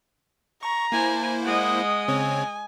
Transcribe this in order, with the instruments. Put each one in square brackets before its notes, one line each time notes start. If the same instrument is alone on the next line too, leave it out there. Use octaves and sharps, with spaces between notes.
[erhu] A#5 [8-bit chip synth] C#6
[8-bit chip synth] A#3 E4 C5 [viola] G#5
[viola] G#3 D#5 [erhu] F#5
[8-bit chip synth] C#3 C4 C#5 [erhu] G#5